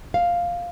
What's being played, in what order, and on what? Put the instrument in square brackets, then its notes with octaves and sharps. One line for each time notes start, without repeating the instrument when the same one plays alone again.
[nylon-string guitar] F5